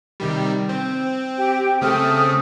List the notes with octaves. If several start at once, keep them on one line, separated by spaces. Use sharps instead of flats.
C3 D#3 G3
C4
G4 G5
C#3 A3 C4 A4 D#6 F6